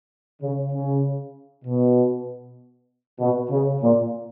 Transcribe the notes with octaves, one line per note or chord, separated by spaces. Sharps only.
C#3
C#3
B2
B2
C#3
A#2